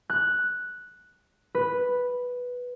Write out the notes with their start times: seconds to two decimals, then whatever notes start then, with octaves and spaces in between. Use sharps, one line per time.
0.10 F#6
1.55 B4